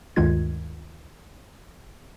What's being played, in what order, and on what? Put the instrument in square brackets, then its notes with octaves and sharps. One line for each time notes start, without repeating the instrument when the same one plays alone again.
[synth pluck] D2 G2 D#3 G#3 F4 G#6